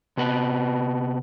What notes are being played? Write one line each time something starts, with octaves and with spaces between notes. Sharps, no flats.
C3 B3 B4